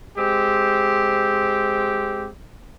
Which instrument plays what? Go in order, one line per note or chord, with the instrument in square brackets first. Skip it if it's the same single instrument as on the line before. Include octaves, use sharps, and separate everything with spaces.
[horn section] G#3 C4 G4